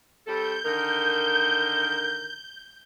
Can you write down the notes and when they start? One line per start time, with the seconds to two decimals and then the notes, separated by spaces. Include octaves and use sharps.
0.27 G3 C4 A4 G6
0.65 D3 D#3 A#4